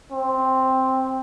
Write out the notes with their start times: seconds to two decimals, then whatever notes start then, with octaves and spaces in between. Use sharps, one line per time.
0.12 C4